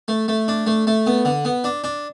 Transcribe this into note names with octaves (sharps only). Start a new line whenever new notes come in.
A3
A3
D4
A3
A3
B3
D3
B3
D4
D4